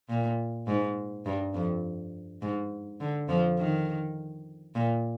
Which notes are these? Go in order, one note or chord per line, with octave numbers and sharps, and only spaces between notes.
A#2
G#2
G2
F2
G#2
D3
F2 F3
D#3
A#2